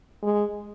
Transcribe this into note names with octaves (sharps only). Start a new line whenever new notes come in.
G#3